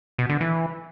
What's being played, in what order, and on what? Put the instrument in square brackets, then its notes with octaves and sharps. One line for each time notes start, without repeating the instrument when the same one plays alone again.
[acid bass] B2
D3
E3